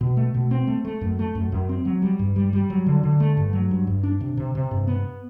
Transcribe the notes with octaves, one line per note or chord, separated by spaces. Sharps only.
B2
A3
B2
C4
A3
A3
F#2
A3
F#2
F#2
C4
F#3
G3
G2
G3
G3
F#3
D3
D3
A3
G2
F#3
G2
G2
D4
C3
C3
C3
G2
B3